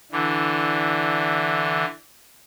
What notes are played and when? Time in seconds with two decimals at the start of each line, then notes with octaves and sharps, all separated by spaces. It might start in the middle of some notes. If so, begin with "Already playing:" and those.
0.12 D3 E3